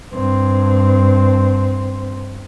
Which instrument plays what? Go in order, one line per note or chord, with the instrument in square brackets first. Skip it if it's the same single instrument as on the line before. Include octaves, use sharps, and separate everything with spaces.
[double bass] G2 C4